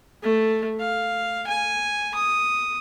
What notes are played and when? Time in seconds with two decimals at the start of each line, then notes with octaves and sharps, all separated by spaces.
0.23 A3
0.80 F5
1.47 G#5
2.15 D#6